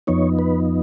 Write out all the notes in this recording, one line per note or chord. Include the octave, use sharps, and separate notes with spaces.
F2 F3 B3 D#4 C#5
B4